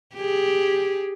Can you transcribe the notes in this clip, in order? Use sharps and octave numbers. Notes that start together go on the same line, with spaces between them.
G4 G#4